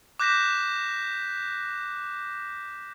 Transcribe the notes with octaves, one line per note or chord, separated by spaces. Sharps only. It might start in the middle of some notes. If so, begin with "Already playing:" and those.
D6 F#6 G6 A#6 B6 E7